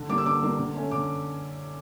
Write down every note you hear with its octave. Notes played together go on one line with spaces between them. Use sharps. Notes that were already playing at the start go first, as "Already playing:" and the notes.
Already playing: D3
G3 A#3 D4 D6
E6
D3 D6
G3 A#3 D4
D3
A3 C#4
D3 D6